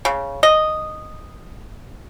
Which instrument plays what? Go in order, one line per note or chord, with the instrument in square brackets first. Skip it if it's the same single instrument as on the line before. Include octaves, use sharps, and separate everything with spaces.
[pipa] C#3
D#5